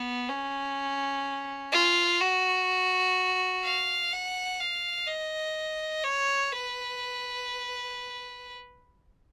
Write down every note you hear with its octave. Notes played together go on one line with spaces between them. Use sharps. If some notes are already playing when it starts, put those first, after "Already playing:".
Already playing: B3
C#4
F4
F#4
F5
F#5
F5
D#5
C#5
B4